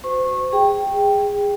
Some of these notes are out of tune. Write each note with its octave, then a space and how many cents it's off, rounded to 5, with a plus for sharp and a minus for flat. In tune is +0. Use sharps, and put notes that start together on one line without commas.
F#4 +0 C5 -25 C#6 -25
G#4 -20 G5 +0